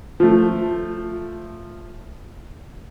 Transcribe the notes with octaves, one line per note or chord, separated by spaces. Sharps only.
F3 A3